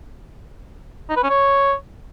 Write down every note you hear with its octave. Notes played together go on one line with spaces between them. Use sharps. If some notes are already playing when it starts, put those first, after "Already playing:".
D#4
B4
C#4
C#5